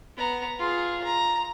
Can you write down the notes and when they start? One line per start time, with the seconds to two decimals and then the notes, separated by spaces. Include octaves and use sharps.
0.17 B3 A#5
0.59 F4 G#4
1.04 A#5